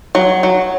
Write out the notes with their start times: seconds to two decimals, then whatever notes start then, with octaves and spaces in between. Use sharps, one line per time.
0.15 F#3
0.43 F#3